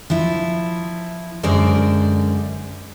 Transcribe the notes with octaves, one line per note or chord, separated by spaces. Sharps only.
F3 E4
F#2 D3 G#3 A#4 C5 D5